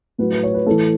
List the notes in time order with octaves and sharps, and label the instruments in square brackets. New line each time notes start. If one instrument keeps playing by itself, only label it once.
[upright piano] A2 F#3 B4
B4
C#5
B4
A2 E3 A4